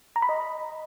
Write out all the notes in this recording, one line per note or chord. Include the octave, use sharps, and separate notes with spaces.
A#5
B5
D#5